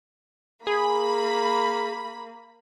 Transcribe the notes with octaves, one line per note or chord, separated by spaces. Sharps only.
A#3 G#4 B5